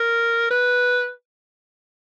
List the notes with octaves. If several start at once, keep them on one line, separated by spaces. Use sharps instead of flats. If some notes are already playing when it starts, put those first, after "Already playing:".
Already playing: A#4
B4